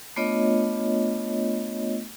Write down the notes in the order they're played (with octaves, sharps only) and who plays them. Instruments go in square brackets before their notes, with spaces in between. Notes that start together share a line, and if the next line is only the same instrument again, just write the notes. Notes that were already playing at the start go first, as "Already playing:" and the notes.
[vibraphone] A3 B3 D4 F4 C#5 D#5